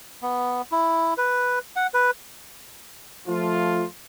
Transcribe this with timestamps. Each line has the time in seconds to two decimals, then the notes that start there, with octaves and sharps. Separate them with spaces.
0.22 B3
0.72 E4
1.18 B4
1.76 F#5
1.94 B4
3.27 F3 A3 F4